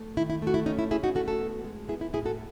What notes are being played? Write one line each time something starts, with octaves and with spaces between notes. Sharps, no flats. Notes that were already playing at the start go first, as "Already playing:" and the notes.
Already playing: A3
D#3 E4
E4
A3 F#4
E4
C#4 D#4
E4
C#4 E4 G#4
D#4 F#4
A3 F#4 A4
F#4 A4
B3
G#3
B3 E4 G#4
E4
A2 E4 G#4
F#4 A4